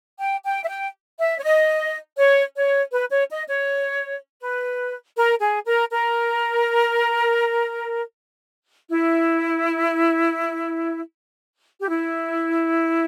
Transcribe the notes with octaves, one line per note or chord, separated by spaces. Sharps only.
G5
G5
E5
G5
E5
C#5
D#5
C#5
C#5
B4
C#5
D#5
C#5
B4
A#4
G#4
A#4
A#4
E4
G4
E4